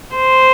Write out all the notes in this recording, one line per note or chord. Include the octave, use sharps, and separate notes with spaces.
C5